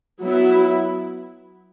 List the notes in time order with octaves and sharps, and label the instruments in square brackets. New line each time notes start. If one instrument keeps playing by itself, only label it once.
[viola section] F#3 B3 E4